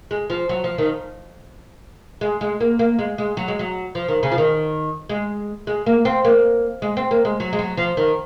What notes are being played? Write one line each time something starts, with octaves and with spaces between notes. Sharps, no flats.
G#3
F3
F#3
F3
D#3
G#3
G#3
A#3
A#3
G#3
G#3
F#3
G#3
F#3
F3
D#3
C#3
F3
D#3
G#3
G#3
A#3
C4
A#3
G#3
C4
A#3
G#3
F#3
G#3
F#3
F3
D#3